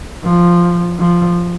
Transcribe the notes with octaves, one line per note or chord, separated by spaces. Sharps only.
F3
F3